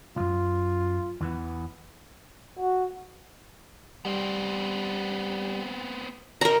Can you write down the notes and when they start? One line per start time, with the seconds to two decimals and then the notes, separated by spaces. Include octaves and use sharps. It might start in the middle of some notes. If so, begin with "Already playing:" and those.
0.16 C2 F#2 F4
1.21 E2 E3 B3
2.59 F#4
4.05 G3 B3 C4
6.41 C#3 D#4 A#4 A#5